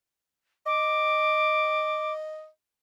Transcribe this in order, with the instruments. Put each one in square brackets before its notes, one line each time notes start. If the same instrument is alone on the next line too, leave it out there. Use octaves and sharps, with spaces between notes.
[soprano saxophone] D#5 [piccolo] D6